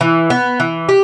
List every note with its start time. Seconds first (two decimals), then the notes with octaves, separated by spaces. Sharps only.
0.01 E3
0.30 B3
0.60 E3
0.89 G4